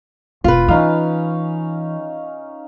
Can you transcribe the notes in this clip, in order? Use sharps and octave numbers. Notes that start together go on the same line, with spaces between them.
E1 F4 B4
E3 C#4 D#4 F5